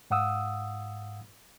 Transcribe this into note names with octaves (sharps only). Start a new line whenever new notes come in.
G#2 F5 F#5 D#6 E6